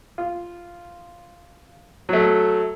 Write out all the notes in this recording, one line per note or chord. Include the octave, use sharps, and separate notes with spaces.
F4
F#3 A3